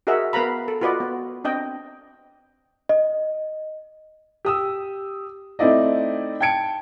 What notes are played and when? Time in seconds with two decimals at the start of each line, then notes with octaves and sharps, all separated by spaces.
0.07 F#4 G#4 A#4 D#5 E5 F#5
0.33 B3 A#4 B4 F5 A#5 B5
0.68 A4
0.81 F4 F#4 B4 D5 D#5 F#5
1.00 B3
1.44 C4 D4 D#5 G5
2.89 D#5
4.45 G4 D#6 E6
5.59 A3 C4 D#4 E4 D5 D#5
6.41 G5 A5 G#6 C#7 D7